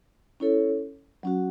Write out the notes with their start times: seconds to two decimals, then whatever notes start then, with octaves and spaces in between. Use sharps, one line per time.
0.40 C#4 E4 A4 C#5
1.23 F#3 C#4 F#4